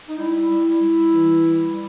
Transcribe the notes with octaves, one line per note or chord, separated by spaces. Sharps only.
D#4
G3 E4
G3
G3
E3
G3
G3